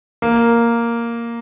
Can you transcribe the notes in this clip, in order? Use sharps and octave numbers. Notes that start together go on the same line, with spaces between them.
A#3